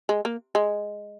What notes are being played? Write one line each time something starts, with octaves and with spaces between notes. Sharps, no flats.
G#3
A#3
G#3